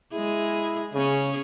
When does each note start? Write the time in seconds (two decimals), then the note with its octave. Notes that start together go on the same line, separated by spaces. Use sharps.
0.13 G#3 E4 G#4
0.94 C#3 C#4 G#4